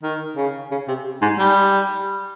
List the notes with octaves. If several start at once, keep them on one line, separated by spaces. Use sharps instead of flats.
D#3
C#3
C#3
C3
G#2
G3